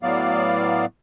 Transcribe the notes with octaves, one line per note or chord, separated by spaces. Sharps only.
A2 F#3 B3 D5 F5